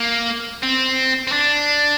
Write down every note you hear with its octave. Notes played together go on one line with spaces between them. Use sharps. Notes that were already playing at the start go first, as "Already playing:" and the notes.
Already playing: A#3
C4
C4
D4